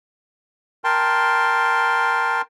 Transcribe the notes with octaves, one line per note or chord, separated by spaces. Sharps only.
A#4 G5 A5 C6